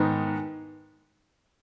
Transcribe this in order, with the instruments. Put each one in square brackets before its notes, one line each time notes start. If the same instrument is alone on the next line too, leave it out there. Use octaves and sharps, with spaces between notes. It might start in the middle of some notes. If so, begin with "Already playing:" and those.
Already playing: [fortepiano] G#2 D#3 B3